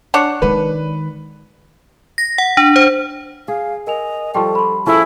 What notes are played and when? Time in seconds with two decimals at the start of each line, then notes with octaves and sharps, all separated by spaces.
0.14 D4 C#5 F#5
0.42 D#3 G#3 B4
2.18 A#6
2.38 F#5
2.57 D4
2.76 C5
3.48 G#4 F5
3.87 A#4 D#5 G#5 F7
4.35 F3 G3 D4 A4 G5 C6 C#6
4.55 B5 C6
4.86 F3 C#4 E4 G#4 A4